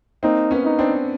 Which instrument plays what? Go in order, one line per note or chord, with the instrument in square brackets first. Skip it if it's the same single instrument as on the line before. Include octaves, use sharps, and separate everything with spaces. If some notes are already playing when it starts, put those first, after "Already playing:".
[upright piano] A#3 C4 [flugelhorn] D#4
[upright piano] B3 C#4
[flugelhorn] D#4
[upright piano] C4 D4